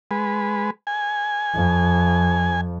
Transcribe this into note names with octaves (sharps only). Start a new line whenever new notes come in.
G#3 B4
G#5
F2